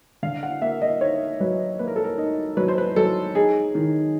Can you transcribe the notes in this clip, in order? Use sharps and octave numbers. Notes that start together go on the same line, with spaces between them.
D3 F5
F#5
A#3 E5
D#5
D#4 C#5
F#3 B4
A#3 B4
A#4
A4
A#4
D#4
F#3 B4
C5
B4
F#3 A4
D#4 G#4
D#3